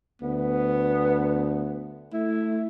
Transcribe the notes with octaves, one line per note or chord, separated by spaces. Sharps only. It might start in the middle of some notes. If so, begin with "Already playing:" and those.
D2 B3
A3 E4